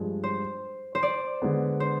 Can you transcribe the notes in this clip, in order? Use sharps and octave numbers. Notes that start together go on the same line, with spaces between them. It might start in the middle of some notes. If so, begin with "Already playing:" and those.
Already playing: G2 F3 G#3
C5
C5
D5
D3 G#3 B3
C5